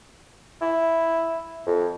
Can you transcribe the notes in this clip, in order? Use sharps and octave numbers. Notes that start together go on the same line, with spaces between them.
E4
F2